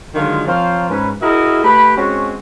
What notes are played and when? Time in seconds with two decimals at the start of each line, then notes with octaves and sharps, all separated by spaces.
0.15 D3 D#3 F#3 G#3 F4
0.47 F3 C4 A#4 C5 C#5 F5
0.89 G#2 C#4 B4
1.21 E4 F#4 G#4 A#4 D#5 E5
1.64 A3 G4 B4 B5
1.97 G#3 C4 C#4 F#4